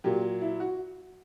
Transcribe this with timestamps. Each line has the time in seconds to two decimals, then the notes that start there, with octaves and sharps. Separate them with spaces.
0.04 A#2 F#3 G4
0.41 E4
0.60 F#4